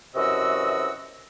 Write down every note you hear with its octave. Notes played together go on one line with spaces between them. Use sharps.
F#2 C3 E3 F#4 D#5 E6